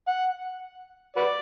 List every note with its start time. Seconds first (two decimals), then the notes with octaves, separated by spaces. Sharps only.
0.08 F#5
1.16 F#4 B4 D5